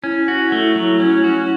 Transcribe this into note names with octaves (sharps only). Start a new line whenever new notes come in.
C#4 E4
F#4
A3
F#3
C#4
F#4